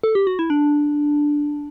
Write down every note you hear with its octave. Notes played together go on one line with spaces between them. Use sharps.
A4
G4
F#4
E4
D4